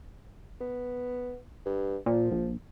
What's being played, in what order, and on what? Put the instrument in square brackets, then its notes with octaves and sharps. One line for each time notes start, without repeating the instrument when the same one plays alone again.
[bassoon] B3
G2
[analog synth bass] A#2 [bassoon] F3
[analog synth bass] A#1